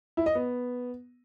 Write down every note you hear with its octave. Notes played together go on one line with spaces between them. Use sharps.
E4
D#5
B3